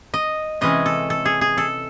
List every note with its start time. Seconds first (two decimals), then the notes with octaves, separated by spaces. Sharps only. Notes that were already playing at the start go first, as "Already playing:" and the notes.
0.14 D#5
0.61 C3 E3 G#3 C#4 D#5
0.86 A4
1.10 A4
1.25 G#4
1.41 G#4
1.57 A4